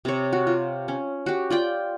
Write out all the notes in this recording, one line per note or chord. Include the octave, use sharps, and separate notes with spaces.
C3 C#5
F#4
F4
C#4
F#4 G4
F4 D5 G5